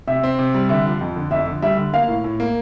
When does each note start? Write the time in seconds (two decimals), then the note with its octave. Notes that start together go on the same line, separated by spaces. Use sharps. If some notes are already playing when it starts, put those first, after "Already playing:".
0.07 C3 E5
0.23 C4
0.39 C3
0.54 G3
0.69 D3 E5
0.86 F3
1.01 F2
1.16 D3
1.31 F2 E5
1.47 D3
1.62 G3 E5
1.77 D3
1.94 A#3 F5
2.08 A2
2.24 A2
2.40 A#3